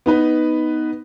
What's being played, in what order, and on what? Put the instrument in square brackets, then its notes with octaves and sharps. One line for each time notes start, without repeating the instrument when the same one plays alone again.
[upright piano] B3 D#4 B4